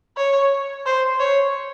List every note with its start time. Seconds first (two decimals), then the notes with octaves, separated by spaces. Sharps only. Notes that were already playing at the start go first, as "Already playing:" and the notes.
0.17 C#5
0.86 C5
1.20 C#5